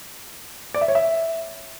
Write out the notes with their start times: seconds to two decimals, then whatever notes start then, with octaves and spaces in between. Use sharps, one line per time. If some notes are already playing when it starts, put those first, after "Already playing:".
0.74 D5
0.81 E5
0.88 C#5
0.95 E5